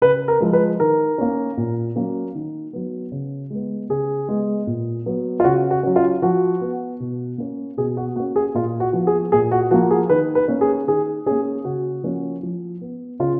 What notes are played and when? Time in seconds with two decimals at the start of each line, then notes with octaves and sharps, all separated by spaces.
0.02 C#3 B4
0.28 A#4
0.40 F3 G#3
0.53 B4
0.80 D#3 A#4
1.18 A#3 C#4
1.57 A#2
1.96 F#3 A#3 C#4
2.35 D#3
2.73 F#3 B3
3.12 C#3
3.50 G#3 B3
3.89 C#3 G#4
4.29 G#3 B3
4.67 A#2
5.06 F#3 B3
5.40 F4
5.44 C#3 F#4
5.71 F#4
5.83 F#3 C#4
5.96 F4
6.22 F3 F#4
6.61 B3
7.00 B2
7.38 A#3 C#4
7.77 B2 G#4
7.97 F#4
8.16 A#3 C#4 F#4
8.36 G#4
8.54 A#2 F4
8.80 F#4
8.93 F3 B3
9.07 G#4
9.32 A#2 G#4
9.51 F#4
9.71 F3 A#3 F#4
9.91 G#4
10.10 D#3 B4
10.35 B4
10.48 A#3 C#4
10.61 G#4
10.87 D#3 G#4
11.26 A#3 C#4 G#4
11.64 C#3 F#4
12.03 F3 A#3 C#4
12.43 F3
12.81 B3
13.20 C#3 F4